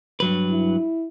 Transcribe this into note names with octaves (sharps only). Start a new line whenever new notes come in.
G2 F#3 B4
E4